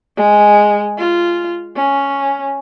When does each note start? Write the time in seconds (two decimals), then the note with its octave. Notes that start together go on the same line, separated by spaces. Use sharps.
0.17 G#3
0.98 F4
1.76 C#4